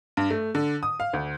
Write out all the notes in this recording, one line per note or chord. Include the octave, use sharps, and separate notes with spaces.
G2
A3
D3
D#6
F5
D2